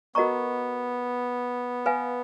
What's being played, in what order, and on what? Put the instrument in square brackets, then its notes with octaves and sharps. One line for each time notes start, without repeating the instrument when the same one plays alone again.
[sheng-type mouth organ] B3 [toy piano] F#4 A#4 D#5 A#5 C#6
[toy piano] B4 F5 G#5